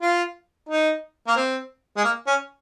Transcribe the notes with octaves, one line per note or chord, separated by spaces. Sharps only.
F4
D#4
A#3
C4
G#3
A#3
C#4